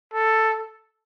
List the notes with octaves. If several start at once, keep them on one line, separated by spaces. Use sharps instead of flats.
A4